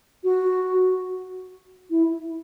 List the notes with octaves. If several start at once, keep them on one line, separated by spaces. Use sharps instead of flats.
F#4
E4